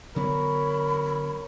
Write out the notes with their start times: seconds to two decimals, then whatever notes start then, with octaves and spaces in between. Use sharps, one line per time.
0.16 D3 F#3 B3 A#4 C#5 B5